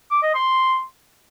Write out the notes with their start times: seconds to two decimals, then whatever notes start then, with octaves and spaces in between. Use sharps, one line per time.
0.11 D6
0.23 D#5
0.35 C6